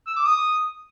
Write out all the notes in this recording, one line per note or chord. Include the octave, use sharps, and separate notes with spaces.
E6
D6
D#6